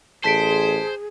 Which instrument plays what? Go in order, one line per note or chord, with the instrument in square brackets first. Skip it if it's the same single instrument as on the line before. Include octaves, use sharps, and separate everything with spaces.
[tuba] A1 [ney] G#4 [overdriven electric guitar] C5 [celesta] A5 B6 D7